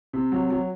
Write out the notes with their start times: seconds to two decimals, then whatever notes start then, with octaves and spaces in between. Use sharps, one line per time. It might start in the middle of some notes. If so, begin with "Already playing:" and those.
0.13 C3
0.32 F#3
0.50 F#3